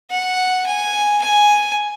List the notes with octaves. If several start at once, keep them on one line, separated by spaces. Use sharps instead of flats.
F#5
G#5
G#5